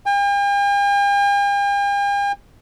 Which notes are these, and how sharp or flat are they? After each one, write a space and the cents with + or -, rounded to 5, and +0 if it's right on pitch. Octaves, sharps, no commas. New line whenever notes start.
G5 +45